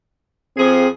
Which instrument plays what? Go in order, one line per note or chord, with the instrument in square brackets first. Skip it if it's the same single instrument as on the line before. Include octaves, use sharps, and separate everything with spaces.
[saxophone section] F2 F3 G#4 [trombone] C4